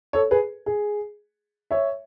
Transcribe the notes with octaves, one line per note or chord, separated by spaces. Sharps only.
A4 C#5
G#4 B4
G#4
C#5 E5